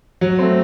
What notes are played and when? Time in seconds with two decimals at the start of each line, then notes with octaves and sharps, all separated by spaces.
0.21 F#3
0.39 A3 C4